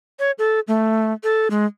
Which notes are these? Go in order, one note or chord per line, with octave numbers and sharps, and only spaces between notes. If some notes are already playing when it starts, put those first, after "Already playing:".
C#5
A4
A3
A4
G#3